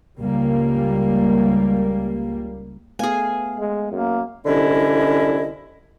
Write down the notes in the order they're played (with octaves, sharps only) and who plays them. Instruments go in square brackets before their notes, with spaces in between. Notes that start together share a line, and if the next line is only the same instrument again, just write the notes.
[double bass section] C#2 G3 A#3
[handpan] A3 B3 F5 [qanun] G#4 G#5
[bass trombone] G#3
[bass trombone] F#2 [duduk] A#3
[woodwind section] C2 D3 C#4 E4 D#5